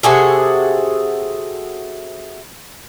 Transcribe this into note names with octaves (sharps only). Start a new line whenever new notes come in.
C3 F#4 G#4 A4